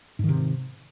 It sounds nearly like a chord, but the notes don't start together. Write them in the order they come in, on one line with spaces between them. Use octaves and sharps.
G#2 D#3 C3